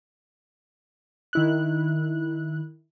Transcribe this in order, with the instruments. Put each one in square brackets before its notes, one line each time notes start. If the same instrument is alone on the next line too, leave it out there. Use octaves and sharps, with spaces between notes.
[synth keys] D#3 E4 F#6